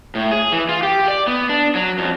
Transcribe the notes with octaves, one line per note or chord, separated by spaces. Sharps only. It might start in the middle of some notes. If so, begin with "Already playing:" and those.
A2
G#4
E3
F4
G4
D5
B3
D4
F#3
F2